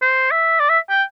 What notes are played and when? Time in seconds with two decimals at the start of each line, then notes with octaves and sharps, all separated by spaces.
0.02 C5
0.31 E5
0.60 D5
0.70 E5
0.90 G5